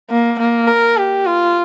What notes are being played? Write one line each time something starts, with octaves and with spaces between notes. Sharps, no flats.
A#3
A#3
A#4
G4
F4